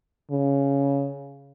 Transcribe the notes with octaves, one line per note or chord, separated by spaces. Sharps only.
C#3